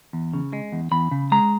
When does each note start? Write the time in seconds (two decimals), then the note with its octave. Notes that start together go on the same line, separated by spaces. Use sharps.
0.13 E2
0.33 C#3
0.53 G#3
0.72 E2
0.91 E2 B5
1.11 C#3
1.32 G#3 A#5